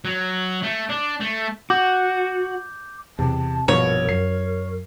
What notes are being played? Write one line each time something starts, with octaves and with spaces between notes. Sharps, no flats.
F#3
A3
D4
A3
F#4 D6 G6
E2 C3 A5
A#1 G2 B2 A#4 C#5
F#2 A#4 C7